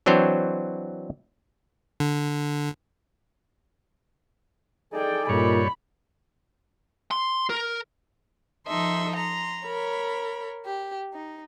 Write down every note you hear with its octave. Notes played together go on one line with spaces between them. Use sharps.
E3 F#3 C4 D4 C5 C#5
D3
D#4 G#4 A4 D5 G5
G2 A#2 C#5 B5
C6
A#4
F3 D#4 A4 D#5 E5 C6
A#5 C6
A#4 C#5 B5
G4
D#4